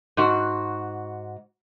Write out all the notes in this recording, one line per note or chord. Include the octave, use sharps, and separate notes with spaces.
G#2 F#4